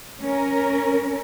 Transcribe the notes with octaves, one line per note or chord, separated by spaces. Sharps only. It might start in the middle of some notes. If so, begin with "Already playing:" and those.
C#4 A#4